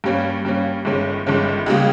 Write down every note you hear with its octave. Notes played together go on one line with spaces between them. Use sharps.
G2 G3 A#3 C#4
G2 G3 A#3 C#4
G1 G2 D#3 G#3 C#4
G1 G2 D#3 G#3 C#4
C#2 C#3 G3 A#3